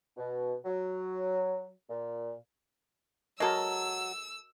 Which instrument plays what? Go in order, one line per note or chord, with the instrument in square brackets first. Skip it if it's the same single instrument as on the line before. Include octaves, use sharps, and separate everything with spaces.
[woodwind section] B2
F#3
A#2
[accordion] F#3 [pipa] G#3 A4 [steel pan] F#4 A#4 D#5 [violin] E6